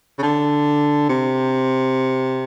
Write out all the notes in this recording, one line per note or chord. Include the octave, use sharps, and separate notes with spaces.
C#3
D3
C3